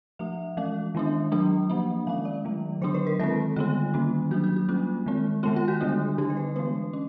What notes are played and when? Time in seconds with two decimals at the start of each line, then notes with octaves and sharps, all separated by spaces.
0.19 F3 A3 D4 E5
0.57 E3 G#3 C#4 F5
0.95 D#3 G#3 B3 D4
1.32 F#3 A3 D4
1.70 F3 A#3 D4
2.07 D#3 G#3 C#4 F5
2.25 D5
2.45 D#3 F#3 A3
2.81 D3 F#3 B3 D4 C5
2.94 B4
3.07 A#4
3.19 D#3 G#3 C4 A4
3.56 D3 G3 B3 F4
3.94 D#3 G3 A#3 C#4
4.31 F#3 A#3 D4 F#4
4.44 F#4
4.56 F#4
4.68 G3 A#3 C#4 F4
5.06 D#3 G#3 C4
5.43 D#3 G#3 B3 F4
5.56 F4
5.68 F#4
5.81 D3 G3 B3 D4
6.18 D3 G3 B3 D4 G4
6.30 C5
6.37 B4
6.56 E3 G#3 B3 D4 B4
6.93 C#4